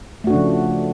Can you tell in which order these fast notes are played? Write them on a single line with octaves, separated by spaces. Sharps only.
A3 F#4 D4 C#3 F3